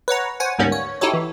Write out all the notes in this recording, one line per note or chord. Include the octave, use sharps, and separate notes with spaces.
B4 C#5 F#5 A#5
C5 C#5 F#5 G#5
D2 G#2 G3 A#3 B3 C#4
C#5
D#4 E4 F#4 G4 A4 C#5
E3